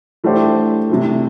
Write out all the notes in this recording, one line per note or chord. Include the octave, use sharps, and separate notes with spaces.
E3 A3 D4 G4 C5
C3 E3 A3